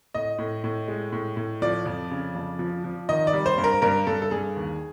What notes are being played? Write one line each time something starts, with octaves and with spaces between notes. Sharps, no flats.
A2 D#5
A2
A2
G#3
A2
A2
F3 D5
F2
C#3
F2
F3
F3
D#3 D#5
D5
G3
C5
G2
A#4
G2 A#4
G2 A4
A4
G2 G#4
D#2